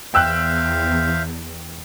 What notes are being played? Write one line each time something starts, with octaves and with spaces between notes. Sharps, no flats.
E2 C5 E5 F5 G5 E6 F#6